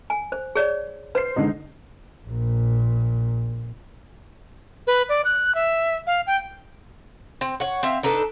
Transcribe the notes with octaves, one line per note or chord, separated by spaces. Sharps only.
G#5
C5
G#4 C#5 D5
B4 C5 C7
D3 G#3 D#4
A#1 A#2
B4
D5
F#6
E5
F5
G5
C4
C#5 F#5
C4 E5 F5
D4 D#4 A4 B4